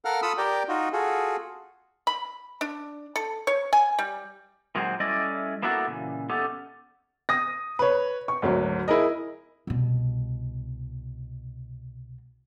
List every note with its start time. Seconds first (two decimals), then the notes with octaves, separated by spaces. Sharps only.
0.05 A4 A#4 F5 F#5 F6
0.22 F4 A4 B5 D#6 E6
0.38 G4 A#4 D5 G5
0.68 D#4 F4 F#4
0.93 F4 F#4 G#4 A4
2.07 B5
2.61 D4
3.16 A4
3.47 C#5
3.73 G#5
3.99 G3
4.75 A#2 D#3 F#3 G#3 A3 C4
5.00 G3 A3 C#4 E4 D5 D#5
5.62 A#3 B3 D4 E4 F#4 A4
5.87 A#2 C#3 E3
6.29 A3 B3 C#4 D#4 G4 A4
7.29 D#6 A#6
7.79 B4 C#5
8.28 C#6
8.42 G#1 D2 F#3
8.88 E4 G#4 A#4 D#5
9.67 C2 B2